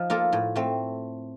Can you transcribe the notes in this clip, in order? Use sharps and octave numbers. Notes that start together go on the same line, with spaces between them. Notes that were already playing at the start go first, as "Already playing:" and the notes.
Already playing: F3 D#4
A#3 F4 A4
A2
A3 C4